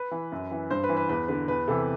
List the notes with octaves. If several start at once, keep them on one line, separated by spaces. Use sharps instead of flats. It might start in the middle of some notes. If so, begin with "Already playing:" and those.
Already playing: B4
E3
F#2
E3
G2 C5
B4
E3
B4
E2 B4
D3 B4
E2 B4
C3 E3 A4